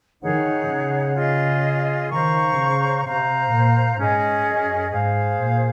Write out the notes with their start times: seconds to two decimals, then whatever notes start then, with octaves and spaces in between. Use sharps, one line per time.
0.22 D#3 D#4 G#4 C#5 F#5
0.69 C#3
1.16 F4 G#4 D#5
2.10 D#3 C5 F5 A#5 C#6
2.57 C#3
3.04 C3 C5 F5 A#5
3.50 A#2
3.97 G#2 C#4 G#4 D#5
4.45 F#2
4.91 G#2 G#4 C5 F5
5.38 A#2